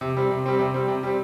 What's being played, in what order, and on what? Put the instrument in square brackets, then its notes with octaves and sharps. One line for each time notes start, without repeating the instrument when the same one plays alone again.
[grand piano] C3
G3 C4
C3
G3 C4
C3
G3 C4
C3
G3 C4